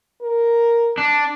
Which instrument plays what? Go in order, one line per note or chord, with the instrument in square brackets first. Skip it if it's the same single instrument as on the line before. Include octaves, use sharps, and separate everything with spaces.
[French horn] A#4
[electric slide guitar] D4